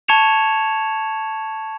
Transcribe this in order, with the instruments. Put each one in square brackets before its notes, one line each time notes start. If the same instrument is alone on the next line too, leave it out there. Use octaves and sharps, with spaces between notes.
[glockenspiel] A5 C#6 G#6 C#7 E7 F7